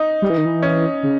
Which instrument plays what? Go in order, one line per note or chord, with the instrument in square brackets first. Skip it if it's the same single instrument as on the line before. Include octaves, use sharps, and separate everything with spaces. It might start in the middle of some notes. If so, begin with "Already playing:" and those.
Already playing: [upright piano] D#4
[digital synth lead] G3
E3
D#3
E3
[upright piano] C#4
[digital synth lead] C#3